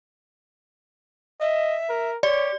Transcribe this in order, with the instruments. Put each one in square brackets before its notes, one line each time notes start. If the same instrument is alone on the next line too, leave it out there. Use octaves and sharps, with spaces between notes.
[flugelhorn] D#5 [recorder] E5
[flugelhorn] A#4
[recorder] G4 [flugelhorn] C#5 [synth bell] D5